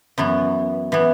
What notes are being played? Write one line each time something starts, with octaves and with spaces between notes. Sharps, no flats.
F#2 E3 B3
E3 B3